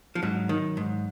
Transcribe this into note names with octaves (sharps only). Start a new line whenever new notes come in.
F3
G#2 F#3
D#3
G#2